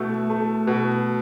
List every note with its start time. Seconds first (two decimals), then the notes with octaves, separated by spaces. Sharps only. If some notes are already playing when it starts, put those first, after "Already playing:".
Already playing: B2 A3 A4
0.30 A3
0.67 B2